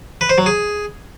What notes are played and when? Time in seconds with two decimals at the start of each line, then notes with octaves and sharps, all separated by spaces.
0.21 B4
0.29 C5
0.38 F#3
0.46 G#4